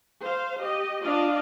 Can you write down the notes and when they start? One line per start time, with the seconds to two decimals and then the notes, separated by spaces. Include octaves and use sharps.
0.22 C5 F5
0.62 G4 D#5
1.04 D4 F4 D5 D#5 F5